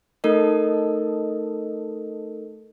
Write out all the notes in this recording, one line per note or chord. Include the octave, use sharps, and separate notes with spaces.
A3 D#4 A4 A#4 D#5